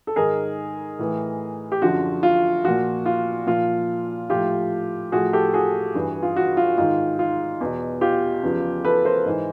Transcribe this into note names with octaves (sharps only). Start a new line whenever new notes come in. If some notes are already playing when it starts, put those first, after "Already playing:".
A4
G#2 D#3 G#4 A#4
A2 E3
G4
F#2 D3 F3 F#4
F4
A#2 F3 F#4
F4
A#2 F3 F4
A2 F3 F4 G4
A2 F3 F#4 G#4
G4 A4
F#4 G#4
G2 E3
F4
F#4
F4
G#2 D#3 F4
F4
E2 B2
F4 G4
E2 C#3 F3
A4 B4
A#4 C5
G#2 E3